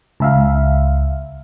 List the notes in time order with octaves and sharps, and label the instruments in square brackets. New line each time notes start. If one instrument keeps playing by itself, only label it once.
[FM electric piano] C#2 E5 F5